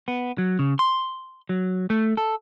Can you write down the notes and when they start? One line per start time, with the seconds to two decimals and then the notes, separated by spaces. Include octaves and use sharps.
0.08 B3
0.38 F#3
0.59 C#3
0.79 C6
1.49 F#3
1.90 A3
2.17 A4